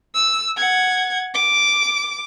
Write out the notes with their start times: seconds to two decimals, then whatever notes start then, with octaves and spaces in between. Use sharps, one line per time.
0.14 E6
0.57 F#5 G#6
1.34 D6